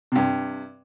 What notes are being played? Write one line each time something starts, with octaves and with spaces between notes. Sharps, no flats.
G2 C3